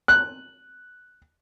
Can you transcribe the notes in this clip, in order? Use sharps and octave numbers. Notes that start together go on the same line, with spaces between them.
F#6